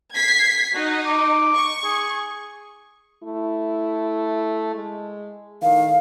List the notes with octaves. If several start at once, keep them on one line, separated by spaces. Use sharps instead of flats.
G#6 B6 C7
D#4 F#4
D6
C#6
G#4
A3 E4
G#3
A2 D#3 F5